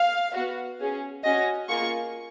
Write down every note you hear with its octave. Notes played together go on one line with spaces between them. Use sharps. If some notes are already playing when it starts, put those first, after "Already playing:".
Already playing: F5
B3 F#4
C#4 G#4
C#4 F#4 D#5
A#3 F4 G#4 C#6